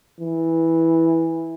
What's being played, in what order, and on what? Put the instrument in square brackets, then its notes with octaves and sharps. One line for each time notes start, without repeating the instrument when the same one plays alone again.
[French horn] E3